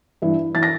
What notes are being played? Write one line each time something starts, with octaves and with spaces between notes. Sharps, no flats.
G2 E3
E3 A6
A#6